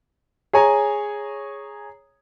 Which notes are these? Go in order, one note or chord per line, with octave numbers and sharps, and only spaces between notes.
G#4 C#5 G#5 A#5